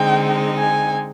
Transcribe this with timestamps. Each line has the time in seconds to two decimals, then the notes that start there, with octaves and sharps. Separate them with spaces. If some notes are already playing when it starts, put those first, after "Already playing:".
Already playing: D3 G#3 C4 D#4 G5
0.58 G#5